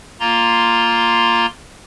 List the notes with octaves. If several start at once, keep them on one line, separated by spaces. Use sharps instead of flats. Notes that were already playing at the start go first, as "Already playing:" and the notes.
A#3 F4 A#5 C6